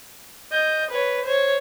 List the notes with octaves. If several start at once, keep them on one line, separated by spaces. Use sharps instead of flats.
D#5 G6
B4 C#5
C5 C#5